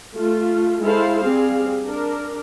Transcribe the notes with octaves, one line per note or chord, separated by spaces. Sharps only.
A3 F4
G#3 E4 A4 C5 F5
G3 C4 G#4 F5
D4 A#4